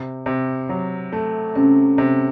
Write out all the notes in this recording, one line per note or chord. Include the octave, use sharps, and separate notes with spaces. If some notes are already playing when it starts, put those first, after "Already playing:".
Already playing: C3
C3
F#3
A3
C3 C#4
C3